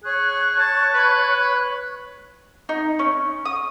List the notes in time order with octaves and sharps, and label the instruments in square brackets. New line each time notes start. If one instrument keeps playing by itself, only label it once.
[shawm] G#4 [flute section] C#5 C#6 F#6
[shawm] A5
B4
[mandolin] D#4
C#4
D#6